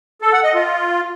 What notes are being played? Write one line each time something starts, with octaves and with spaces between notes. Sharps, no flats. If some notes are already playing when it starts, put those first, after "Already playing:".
A4
F#5
D#5
F4